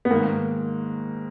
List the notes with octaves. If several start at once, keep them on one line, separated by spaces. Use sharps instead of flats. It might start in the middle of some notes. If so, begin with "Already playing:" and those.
B3
G#2 D#3 A#3